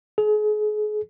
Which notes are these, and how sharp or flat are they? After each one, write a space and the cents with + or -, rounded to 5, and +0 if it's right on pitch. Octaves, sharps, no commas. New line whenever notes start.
G#4 +35